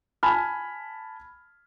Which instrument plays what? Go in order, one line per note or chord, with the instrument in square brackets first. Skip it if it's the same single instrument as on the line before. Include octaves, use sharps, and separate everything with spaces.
[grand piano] G#5 A5 B5 F6